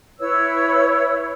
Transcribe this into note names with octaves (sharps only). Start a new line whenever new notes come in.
E4 B4 C#5 E6